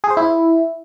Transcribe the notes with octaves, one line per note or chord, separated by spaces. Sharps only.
G#4
C5
E4